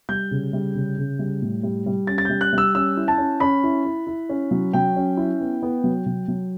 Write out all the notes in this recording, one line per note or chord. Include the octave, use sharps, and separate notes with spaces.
G3 G6
C#3
G3
C#3
C#3
G3
A2
G3
G3
C#4 A6
A6
G3 G6
F#6
G3
E6
C#4 E6
E4
A5
C#4
C#4 B5
E4
E4
E4
C#4
F#3
F#3 G5
C#4
E4
B3
B3
F#3
F#3
F#3